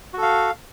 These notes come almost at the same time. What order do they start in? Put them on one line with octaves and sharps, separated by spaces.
F#4 A4 F5